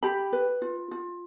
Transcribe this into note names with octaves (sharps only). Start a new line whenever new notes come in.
G4 B5
B4
F4
F4